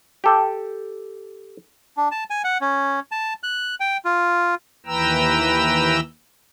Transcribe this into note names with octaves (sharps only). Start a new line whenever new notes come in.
G4 A4 G5
D4
A5
G#5
F#5
C#4
A5
F#6
G5
F4
D#2 E3 B4 G5 A#5 E6